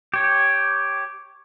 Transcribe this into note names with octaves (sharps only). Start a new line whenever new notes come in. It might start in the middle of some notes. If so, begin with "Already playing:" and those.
G4 C#5